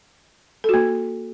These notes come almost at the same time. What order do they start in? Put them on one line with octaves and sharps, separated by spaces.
A4 F#4 A#3